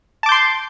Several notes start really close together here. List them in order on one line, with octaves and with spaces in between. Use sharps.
A5 D6 G6 C6